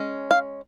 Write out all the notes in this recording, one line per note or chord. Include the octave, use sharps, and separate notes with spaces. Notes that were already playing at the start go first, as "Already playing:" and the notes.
Already playing: G#3 C#4
F5